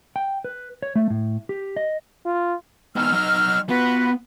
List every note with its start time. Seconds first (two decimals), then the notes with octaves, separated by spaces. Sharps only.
0.16 G5
0.44 B4
0.82 C#5
0.96 A3
1.10 A2
1.49 G4
1.76 D#5
2.26 F4
2.96 G#3 B3 D#4 E6 F6
3.12 F#3 D#5
3.69 B3 F4 F#4 B4